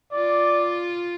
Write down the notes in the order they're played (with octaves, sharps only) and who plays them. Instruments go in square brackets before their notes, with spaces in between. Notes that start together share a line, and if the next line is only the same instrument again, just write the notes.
[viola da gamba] F4 [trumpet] D5